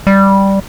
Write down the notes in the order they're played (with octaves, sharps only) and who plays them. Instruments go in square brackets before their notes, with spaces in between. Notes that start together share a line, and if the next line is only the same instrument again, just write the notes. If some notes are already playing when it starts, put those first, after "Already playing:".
[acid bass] G3